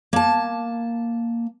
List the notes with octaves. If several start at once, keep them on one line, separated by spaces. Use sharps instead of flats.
A#3 A5